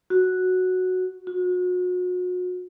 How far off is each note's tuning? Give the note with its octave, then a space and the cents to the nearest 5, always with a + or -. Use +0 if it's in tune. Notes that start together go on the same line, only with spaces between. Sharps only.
F#4 -5
F#4 -35